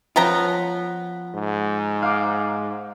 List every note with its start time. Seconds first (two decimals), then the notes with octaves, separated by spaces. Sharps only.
0.16 F3 B3 C#4 F4 G5 A#5
1.35 G#2
2.02 F5 D6